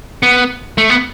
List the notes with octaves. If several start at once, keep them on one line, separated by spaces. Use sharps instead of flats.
B3
A3
B3